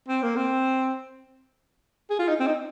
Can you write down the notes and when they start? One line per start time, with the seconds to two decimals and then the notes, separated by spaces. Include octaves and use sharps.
0.08 C4
0.23 A#3
0.37 C4
2.10 G#4
2.19 F4
2.28 D#4
2.40 C4
2.47 D#4